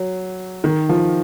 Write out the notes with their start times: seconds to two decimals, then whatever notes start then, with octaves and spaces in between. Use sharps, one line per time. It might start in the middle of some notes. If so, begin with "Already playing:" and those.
Already playing: F#3
0.64 D#3
0.89 F3